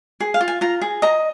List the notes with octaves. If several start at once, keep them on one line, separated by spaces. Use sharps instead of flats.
G#4
F5
F4
G#5
F4 A#5
G#4
D#5 A#5